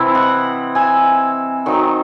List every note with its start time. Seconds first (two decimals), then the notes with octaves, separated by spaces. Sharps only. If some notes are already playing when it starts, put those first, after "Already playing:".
Already playing: C3 E3 C4 E4
0.15 D#5 F#5
0.75 E5 G#5
1.66 D#3 F#3 C4 D#4